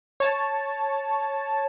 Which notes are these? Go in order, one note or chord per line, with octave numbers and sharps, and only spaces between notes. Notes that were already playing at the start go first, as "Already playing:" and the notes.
C#5 A5